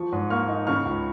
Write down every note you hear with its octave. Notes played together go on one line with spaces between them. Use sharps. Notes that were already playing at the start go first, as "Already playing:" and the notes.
Already playing: F3 C#6
G#2
A#3 C#6 F6
D#4
C#3 C#6 F6
C#2